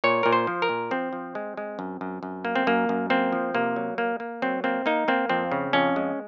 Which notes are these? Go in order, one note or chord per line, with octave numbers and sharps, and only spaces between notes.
A#2 C#5
A#2 A#4
C5
F3
A#4
A#2
F3 C4
F3
G#3
G#3
F#2
F#2
F#2
A#3
C4
F#2 A#3
F#2
A#3 C4
F3
C3 A#3
F#3
A#3
A#3
F#3 C4
A#3 C4
A#3 D#4
A#3 C4
F2 C4
C#3
F2 C#4
G#3